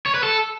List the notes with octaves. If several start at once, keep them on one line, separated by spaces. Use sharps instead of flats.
C#5
B4
A4